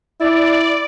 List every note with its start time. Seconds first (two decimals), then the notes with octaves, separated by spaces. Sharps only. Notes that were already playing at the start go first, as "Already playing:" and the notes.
0.20 E4 D5